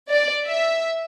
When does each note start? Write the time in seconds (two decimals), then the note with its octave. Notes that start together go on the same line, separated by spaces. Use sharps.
0.10 D5
0.46 E5